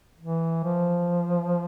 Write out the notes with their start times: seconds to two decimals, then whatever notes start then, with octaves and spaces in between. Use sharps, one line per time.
0.20 E3
0.64 F3